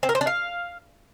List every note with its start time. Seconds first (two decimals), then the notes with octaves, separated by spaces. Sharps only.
0.03 C4
0.09 A#4
0.15 C5
0.21 D4
0.27 F5